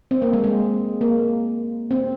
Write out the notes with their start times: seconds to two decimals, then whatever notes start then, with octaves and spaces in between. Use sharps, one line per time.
0.11 C4
0.22 A#3
0.33 G#3
0.44 G#3
1.01 A#3
1.91 C4